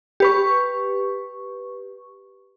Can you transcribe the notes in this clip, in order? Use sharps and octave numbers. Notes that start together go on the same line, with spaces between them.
G4 B4 C#6